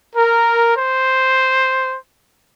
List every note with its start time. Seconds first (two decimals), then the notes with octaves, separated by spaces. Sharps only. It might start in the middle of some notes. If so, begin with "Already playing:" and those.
0.16 A#4
0.74 C5